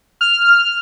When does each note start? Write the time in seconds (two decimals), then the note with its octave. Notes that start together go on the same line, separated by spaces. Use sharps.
0.21 F6